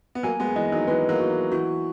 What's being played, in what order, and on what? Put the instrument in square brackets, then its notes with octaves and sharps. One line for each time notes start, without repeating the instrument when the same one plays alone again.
[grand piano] B3
[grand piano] F#3 A#3 [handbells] G#5
[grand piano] G#3 B3
[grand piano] E3 G#3 [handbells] D#5
[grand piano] D#3 F#3
[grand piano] E3 G#3 [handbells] B4
[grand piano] F#3 A#3
[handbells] F#4
[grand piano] E3
[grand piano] E3 [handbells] F#4